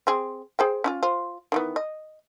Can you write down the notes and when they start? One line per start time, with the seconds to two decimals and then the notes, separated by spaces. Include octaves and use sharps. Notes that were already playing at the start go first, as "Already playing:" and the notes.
0.07 C4 G#4
0.59 G#4 C5 G5
0.84 C#4 D#4 F4
1.03 F4 C5
1.52 D#3 E3 B3
1.76 D#5